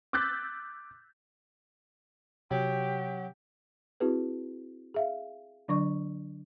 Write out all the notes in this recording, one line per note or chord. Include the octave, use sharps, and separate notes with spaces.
D6 E6 F#6 G6 A6 B6
C3 F#3 G4
C4 E4 F#4 G#4 B4
G#4 E5 F5
D3 F#3 D4 D5 C#6